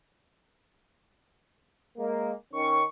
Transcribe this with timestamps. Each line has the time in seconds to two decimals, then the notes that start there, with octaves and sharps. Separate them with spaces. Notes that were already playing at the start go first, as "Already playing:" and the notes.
1.97 G#3 A#3
2.53 D#3 C#4 C#6